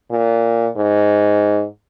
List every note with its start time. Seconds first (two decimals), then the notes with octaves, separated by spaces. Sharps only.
0.11 A#2
0.77 G#2